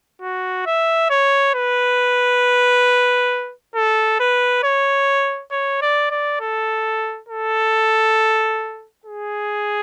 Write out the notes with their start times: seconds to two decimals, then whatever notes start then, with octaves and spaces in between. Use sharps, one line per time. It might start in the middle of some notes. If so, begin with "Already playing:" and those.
0.22 F#4
0.66 E5
1.10 C#5
1.54 B4
3.75 A4
4.20 B4
4.64 C#5
5.52 C#5
5.82 D5
6.11 D5
6.41 A4
7.29 A4
9.06 G#4